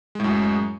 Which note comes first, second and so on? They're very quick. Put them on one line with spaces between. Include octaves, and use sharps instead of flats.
G#3 A2 F#2